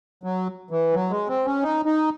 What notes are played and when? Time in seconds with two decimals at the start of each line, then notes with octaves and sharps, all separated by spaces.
0.24 F#3
0.71 E3
0.94 F#3
1.10 G#3
1.28 C4
1.46 C#4
1.63 D#4
1.85 D#4